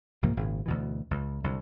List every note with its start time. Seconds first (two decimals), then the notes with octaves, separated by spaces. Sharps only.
0.22 C2 G#2 F3 A#3
0.37 G#1 A#2 C#3
0.66 D2 B2 E3
1.11 C#2
1.44 C2 D3